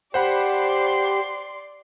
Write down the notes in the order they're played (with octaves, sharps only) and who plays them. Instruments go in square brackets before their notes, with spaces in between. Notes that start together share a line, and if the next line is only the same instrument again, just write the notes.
[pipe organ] G4 [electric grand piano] C5 F#5 B5 [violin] D5 C6